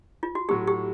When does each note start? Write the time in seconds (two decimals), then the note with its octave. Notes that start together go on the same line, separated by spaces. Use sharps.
0.23 F4
0.35 F#4
0.49 A2 F#3 A3 G4
0.67 G4